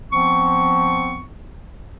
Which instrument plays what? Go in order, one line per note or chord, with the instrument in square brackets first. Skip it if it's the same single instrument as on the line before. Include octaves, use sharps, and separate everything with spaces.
[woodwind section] F3 B3 C4 C#6